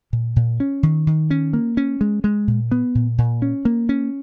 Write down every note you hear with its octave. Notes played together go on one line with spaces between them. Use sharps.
A#2
A#2
C#4
D#3
D#3
C#4
A#3
C#4
G#3
G#3
A#2
B3
A#2
A#2
C#4
A#3
C#4